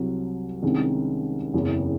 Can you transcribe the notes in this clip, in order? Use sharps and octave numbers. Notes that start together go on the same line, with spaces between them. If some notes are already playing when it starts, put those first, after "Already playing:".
Already playing: C2 C3 F#3
C2 C3 D#3 G#3 C#4
F#1 E2 C#3 E3 C4